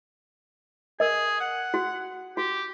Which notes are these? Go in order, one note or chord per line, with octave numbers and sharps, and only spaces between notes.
G#4 A#4 D#5
F#5
F#4
F#4 G4